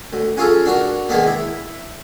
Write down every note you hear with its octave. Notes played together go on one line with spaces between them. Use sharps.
D2
C#4 F4 G#4 A4
D4 F#4 A#4
D#3 G#3 A#3 B3 D4
E4